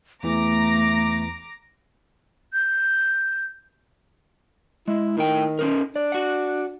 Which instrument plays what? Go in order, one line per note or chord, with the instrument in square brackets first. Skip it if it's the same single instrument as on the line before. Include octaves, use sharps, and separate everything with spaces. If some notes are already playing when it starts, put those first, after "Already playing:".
[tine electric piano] E2 E3 [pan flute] A3 [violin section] A#5 D6 A#6
[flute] G6
[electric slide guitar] G#3 [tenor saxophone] E4
[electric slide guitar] A2 G5 [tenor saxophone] D#3
[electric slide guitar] C#4 D#4 A#4
[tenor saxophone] D4 [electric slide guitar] D5
[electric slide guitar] F#4 F#5